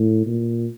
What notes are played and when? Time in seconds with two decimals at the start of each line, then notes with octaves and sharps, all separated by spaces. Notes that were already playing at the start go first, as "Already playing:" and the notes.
Already playing: A2
0.26 A#2